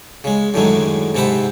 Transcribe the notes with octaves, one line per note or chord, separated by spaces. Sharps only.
C#3 G#3
F#2 A2 D3 D#3 F#3 G#3
G#2 C3 C4 F#5 A5 B5